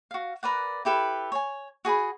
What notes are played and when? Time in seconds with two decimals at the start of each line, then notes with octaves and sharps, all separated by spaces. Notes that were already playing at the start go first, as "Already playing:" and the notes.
0.11 F#4 F5
0.43 A#4 B4 D5 F#5
0.85 E4 G4 A4 B4
1.32 C#5 G#5
1.85 F#4 G#4 G#5 B5